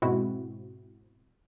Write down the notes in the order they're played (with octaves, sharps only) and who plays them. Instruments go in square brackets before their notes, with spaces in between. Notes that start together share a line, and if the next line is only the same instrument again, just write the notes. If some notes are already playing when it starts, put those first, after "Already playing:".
[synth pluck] G#2 B2 G#3 C4 E4 F#4